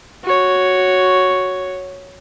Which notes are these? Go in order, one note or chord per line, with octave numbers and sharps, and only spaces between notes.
F#4 C#5